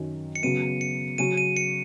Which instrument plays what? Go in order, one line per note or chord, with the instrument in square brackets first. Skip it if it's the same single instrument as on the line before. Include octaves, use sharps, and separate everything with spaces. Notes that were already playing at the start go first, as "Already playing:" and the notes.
Already playing: [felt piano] F#2 D#3 F#3 C#4 F#4
[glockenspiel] C#7
[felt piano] C#3 F#3 B3 F#4 [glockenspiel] D#7
[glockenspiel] C#7
[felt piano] C#3 F#3 C#4 F#4 [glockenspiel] D#7
[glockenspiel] D#7
C#7